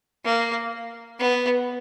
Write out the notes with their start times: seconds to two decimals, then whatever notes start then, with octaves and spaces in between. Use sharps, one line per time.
0.25 A#3
1.19 B3